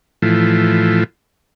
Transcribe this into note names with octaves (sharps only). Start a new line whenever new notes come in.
A2 E3 F3